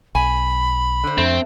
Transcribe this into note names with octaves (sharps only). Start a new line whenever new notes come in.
B1 G#5 B5
D3 C5
F2 A3 C4